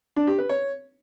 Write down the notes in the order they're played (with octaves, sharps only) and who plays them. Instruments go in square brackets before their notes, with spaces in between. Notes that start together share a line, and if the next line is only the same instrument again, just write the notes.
[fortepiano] D4
G4
B4
C#5